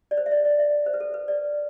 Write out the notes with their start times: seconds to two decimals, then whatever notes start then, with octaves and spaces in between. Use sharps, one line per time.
0.11 D5
0.17 C5
0.26 E5
0.31 D5
0.45 D5
0.59 E5
0.86 C5
0.94 B4
1.00 A4
1.14 B4
1.28 D5